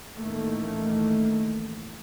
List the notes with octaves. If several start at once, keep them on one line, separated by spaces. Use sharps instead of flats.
A1 D#3 A3 A#3